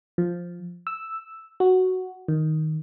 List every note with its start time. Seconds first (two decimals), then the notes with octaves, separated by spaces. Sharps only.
0.18 F3
0.87 E6
1.60 F#4
2.28 D#3